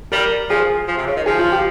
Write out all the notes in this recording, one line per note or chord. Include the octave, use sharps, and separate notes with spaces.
G3 A#4
F3 G#4
F3
C3
C#3
D#3
F3 G#4
F4
G4